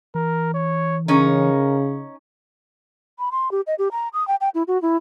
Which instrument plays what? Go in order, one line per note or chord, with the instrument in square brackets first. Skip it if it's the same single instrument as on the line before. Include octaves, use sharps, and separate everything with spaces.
[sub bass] E3 [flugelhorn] A#4
[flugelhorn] C#5
[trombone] C#3 [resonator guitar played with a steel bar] C#4 D#4 [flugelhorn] A#4
[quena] B5
C6
G4
D#5
G4
A#5
D#6
G5
G5
E4
F#4
E4